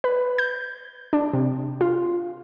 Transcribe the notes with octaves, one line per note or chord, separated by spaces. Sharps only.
B4
G6
D4
C3
F4